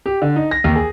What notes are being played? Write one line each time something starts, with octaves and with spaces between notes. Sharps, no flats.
G4
D3
D#4
A#6
D#2
G#4